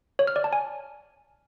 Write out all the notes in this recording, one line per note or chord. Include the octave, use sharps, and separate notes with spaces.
C#5
F6
D5
A5
G#5